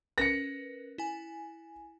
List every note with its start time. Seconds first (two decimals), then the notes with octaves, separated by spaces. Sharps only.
0.18 C#4 A#4 B4 A#6 C#7
0.98 E4 G#5